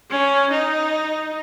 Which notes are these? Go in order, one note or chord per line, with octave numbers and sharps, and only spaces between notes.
C#4
D#4